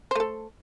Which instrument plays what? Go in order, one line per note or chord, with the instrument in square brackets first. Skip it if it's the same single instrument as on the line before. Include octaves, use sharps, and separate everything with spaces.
[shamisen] C5
A3
A4